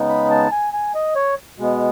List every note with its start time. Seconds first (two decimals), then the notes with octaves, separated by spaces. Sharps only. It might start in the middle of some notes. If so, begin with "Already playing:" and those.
Already playing: C#3 G#3 B3 D#4
0.09 B5
0.31 A5
0.52 G#5
0.73 G#5
0.95 D#5
1.15 C#5
1.58 B2 G#3 B3